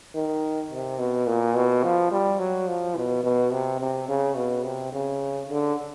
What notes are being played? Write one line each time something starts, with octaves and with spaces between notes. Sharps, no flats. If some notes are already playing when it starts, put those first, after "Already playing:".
D#3
C3
B2
A#2
B2
F3
G3
F#3
F3
B2
B2
C3
C3
C#3
B2
C3
C#3
D3